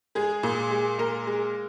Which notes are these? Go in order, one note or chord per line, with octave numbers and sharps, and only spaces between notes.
G#3 G#4
A#2
G#3
A#2 A#4
G#3